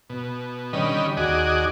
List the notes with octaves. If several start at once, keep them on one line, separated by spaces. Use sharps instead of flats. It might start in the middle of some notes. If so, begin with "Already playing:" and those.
B2
D3 D#3 G3 C#4 D#5 B5
D#2 F#4 G#4 D5 D#5